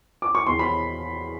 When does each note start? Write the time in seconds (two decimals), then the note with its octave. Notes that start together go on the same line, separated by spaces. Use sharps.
0.22 D6
0.35 C#6
0.47 E2 C6
0.59 B5